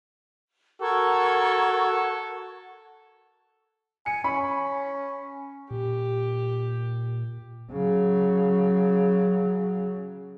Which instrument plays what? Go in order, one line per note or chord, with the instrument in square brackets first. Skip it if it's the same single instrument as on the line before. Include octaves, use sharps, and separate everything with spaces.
[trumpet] F#4 [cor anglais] A4 [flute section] A#4 C#6 G#6
[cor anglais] G#5 [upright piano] C#7
[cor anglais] C#4 [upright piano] B5
[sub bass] A#2 [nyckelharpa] G4
[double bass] C#3 F#3